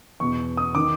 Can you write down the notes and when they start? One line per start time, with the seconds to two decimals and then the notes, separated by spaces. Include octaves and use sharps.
0.20 E2 B2 C#6
0.57 D#6
0.75 D#3 D6